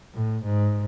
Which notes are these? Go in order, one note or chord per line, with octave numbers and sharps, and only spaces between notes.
A2
G#2